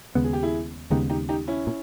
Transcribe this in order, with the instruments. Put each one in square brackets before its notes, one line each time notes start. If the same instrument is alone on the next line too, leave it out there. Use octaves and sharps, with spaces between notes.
[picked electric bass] D#2 C#3 G#3 B3
[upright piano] G#4
G4
E4 G#4
[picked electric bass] D#2 C#3 G#3 B3 [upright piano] D#4 G4
[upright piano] D#4 G4
D#4 G4
C#4 E4
[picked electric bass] A#2